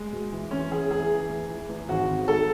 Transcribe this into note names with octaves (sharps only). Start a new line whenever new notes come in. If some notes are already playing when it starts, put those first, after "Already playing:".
Already playing: G#3
B2
E3
E2 C#4
E3 G#4
E2 G#4
E3
E2
E3
E2
G#1 F#4
G#1
G#2 A4